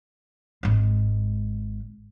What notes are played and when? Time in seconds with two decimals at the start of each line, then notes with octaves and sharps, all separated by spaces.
0.63 G#1 G#3